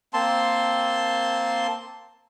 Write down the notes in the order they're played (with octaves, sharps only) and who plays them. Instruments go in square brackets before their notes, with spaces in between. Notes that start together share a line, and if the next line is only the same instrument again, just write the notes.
[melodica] A#3 C4 A5 C6